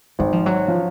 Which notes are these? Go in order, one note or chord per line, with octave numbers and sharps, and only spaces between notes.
G#1 F#3
F3
F#3
F3